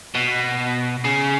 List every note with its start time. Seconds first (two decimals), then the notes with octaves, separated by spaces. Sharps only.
0.15 B2
1.04 C#3